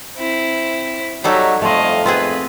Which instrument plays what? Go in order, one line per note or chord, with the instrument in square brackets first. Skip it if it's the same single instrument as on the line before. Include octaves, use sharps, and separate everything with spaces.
[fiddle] C4 E4
[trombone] F#3 [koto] G3 D#4 A4 [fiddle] G4
[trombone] F2 [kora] A3 C4 [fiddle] D#5 F5
[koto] B3 C4 G#4 [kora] F4 [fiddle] B4